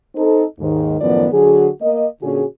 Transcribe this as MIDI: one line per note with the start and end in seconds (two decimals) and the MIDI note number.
0.15 0.44 60
0.15 0.44 63
0.15 0.44 69
0.59 0.96 39
0.59 0.96 44
0.59 0.96 51
1.00 1.27 42
1.00 1.27 45
1.00 1.27 51
1.00 1.27 53
1.00 1.27 59
1.00 1.27 74
1.31 1.68 50
1.31 1.68 54
1.31 1.68 66
1.31 1.68 68
1.81 2.06 58
1.81 2.06 75
2.21 2.44 46
2.21 2.44 50
2.21 2.44 61
2.21 2.44 66
2.21 2.44 68